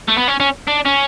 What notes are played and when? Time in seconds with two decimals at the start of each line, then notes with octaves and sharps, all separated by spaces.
0.09 A3
0.17 B3
0.28 C#4
0.40 C#4
0.67 D4
0.85 C#4